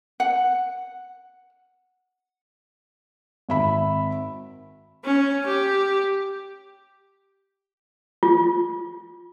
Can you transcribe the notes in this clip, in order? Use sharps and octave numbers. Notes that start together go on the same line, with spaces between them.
F#5
G#1 E5 B5
C#4
G4
F4